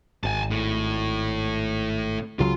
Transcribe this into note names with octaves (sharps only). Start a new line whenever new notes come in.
G#1 G#5 A5
A2
C#2 C#3 F#3 F4